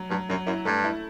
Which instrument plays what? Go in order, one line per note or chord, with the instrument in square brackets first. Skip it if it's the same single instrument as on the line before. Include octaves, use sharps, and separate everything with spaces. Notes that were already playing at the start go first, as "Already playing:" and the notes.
Already playing: [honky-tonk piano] F#3
[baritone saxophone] G2 [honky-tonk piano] F#3
[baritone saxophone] F#2 [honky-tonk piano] F#3
[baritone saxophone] F#2 [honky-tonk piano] E4
[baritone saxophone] G2 [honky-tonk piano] A3
[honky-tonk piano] E4